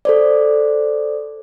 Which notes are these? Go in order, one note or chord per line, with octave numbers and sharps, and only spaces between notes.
A4 C5 D5